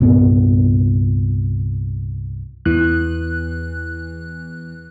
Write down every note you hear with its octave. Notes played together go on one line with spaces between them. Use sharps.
C2 G2 A#2 B3
E2 E3 F#6